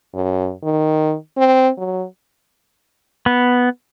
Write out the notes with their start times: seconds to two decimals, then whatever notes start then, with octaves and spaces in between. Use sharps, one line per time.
0.14 F#2
0.63 D#3
1.37 C4
1.78 F#3
3.26 B3